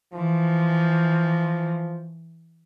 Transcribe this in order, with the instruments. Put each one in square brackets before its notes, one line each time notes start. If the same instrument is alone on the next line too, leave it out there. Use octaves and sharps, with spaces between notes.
[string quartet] E3 [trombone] F3